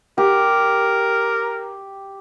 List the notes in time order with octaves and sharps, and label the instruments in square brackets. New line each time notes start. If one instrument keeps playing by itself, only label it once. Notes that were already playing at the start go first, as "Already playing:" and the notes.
[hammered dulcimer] G4 [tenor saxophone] A#4